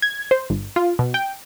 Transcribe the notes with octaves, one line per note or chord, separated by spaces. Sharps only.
G#6
C5
G1
F4
B2
G5